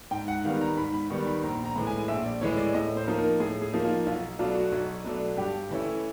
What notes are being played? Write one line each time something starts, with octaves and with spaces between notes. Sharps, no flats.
G#2 G5
F#5
D#3 G3 B3 F5
A#5
G#2 B5
B5
D#3 G3 B3 C#6
B5
A#1 A#5
A#5
A2 E3 G#3
G#5
A#1 E5
D5
A2 E3 G#3 C#5
D5
A2 D#5
C5
F3 A#3 D#4
A#4
A2 G#4
G#4
F3 A#3 D#4
F4
B1 F4
B2 F#3 A3 D4 F4
F#4
B1
B2 F#3 A3 D4
G2 G4
E3 A3 C#4 E4